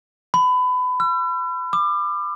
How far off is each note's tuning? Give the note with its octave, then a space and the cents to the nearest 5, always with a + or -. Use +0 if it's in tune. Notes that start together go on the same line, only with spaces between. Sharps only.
B5 +25
E6 +45
D6 +30